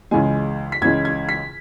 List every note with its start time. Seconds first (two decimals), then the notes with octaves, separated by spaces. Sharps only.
0.11 C#2 C#3 E3 G#3 G#5
0.72 B6
0.81 C#2 C#3 E3 G#3 G#6
1.05 G#6
1.29 B6